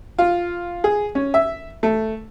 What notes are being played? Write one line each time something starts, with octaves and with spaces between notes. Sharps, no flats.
F4
G#4
C#4
E5
A3